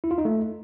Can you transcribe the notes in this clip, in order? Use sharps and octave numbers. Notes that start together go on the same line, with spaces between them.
E4
F4
D#4
A3